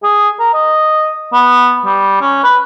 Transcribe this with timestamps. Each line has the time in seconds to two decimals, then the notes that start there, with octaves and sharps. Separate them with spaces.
0.03 G#4
0.39 A#4
0.54 D#5
1.33 B3
1.85 G3
2.21 C#4
2.44 B4